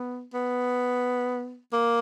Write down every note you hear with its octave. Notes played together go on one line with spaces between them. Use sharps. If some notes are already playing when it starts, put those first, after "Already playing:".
Already playing: B3
B3
A#3